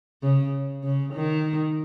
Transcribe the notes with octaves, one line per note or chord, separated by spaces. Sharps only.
C#3
C#3
D#3